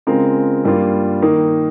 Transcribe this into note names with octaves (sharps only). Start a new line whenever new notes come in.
C#3 G#3 C4 F4 A#4
G2 G3 A#3 F4
D#3 A#3 D#4